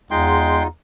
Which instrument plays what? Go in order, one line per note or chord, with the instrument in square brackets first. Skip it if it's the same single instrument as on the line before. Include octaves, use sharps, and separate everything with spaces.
[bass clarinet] E2 [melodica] G#3 G5 C6 [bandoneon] D#4 F4